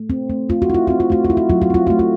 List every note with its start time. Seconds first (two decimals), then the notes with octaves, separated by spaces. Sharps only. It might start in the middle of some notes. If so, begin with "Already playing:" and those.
Already playing: A3
0.10 C4
0.30 A3
0.49 A3 F4
0.62 F#4
0.70 E4 F4
0.87 C4 F#4
1.00 F4
1.10 A3 F#4
1.25 F4
1.30 E4
1.37 F#4
1.50 F#3 F4
1.62 F#4
1.70 C4 F4
1.87 A3 F#4
1.99 F4